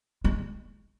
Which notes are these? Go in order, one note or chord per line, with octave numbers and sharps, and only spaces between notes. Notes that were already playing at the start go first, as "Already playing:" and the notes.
G#3